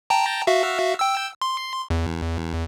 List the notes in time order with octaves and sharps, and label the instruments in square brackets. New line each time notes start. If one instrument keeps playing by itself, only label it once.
[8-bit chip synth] G5 A5 A#5
F#4 E5 F5
G5 E6
C6
E2